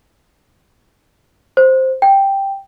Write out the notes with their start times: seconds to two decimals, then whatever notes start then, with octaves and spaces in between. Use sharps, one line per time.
1.57 C5
2.02 G5